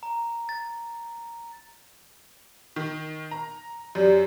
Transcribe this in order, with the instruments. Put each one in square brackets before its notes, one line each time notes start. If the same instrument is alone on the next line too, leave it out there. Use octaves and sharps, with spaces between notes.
[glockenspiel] A#5
A6
[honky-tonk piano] D#3
A#5
[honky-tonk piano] F#2 [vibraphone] G4 D5